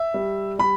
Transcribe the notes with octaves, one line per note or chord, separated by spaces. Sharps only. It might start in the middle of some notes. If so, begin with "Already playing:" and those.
Already playing: E5
G3
G3 B5